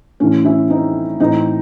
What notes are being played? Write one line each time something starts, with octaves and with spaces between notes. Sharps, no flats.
A2 E3 C#4
C#4 E4
C4 D#4
A2 E3 C4 D#4